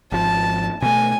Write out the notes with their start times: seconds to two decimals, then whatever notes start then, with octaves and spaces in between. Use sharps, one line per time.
0.12 G#1 F3 A5
0.82 B2 A3 G#5